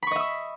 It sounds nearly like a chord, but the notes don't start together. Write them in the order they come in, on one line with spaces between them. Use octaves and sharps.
B5 C#6 D#5 E5 D#6